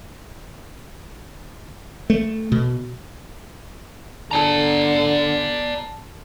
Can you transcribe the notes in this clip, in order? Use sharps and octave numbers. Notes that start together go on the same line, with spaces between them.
A3
B2
D3 A4 D5 A5 A#5